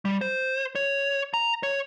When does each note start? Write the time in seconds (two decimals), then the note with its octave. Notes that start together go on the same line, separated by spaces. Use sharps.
0.05 G3
0.21 C5
0.75 C#5
1.34 A#5
1.63 C#5